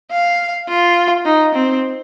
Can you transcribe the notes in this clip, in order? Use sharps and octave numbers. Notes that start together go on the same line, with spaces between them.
F5
F4
D#4
C4